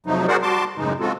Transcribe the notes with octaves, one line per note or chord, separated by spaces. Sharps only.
F2 C3 F3 F#3 A3 D#4
F#4 G#4 A#4 C5 D5 F#5
G3 F#4 A5 C6 D6
F#2 A2 C#3 E3 G#3 D#4
G#3 C4 F4 F#4 A4